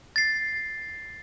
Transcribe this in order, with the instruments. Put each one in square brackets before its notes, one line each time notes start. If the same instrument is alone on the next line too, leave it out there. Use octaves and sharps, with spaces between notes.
[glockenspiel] A6 C7